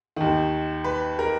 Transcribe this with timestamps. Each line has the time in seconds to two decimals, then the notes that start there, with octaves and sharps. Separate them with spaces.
0.16 D#2 D#3
0.84 B4
1.19 A#4